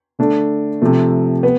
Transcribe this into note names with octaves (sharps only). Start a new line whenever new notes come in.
D3 A3 D4
C3 F3 A3
B3